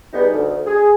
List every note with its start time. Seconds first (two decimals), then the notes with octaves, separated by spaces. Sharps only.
0.13 G3 G#3 B3 D#4
0.32 D2
0.66 G#4